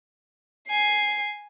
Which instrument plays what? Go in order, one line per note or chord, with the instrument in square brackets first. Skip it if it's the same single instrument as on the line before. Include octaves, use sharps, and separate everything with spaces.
[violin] G#5 C7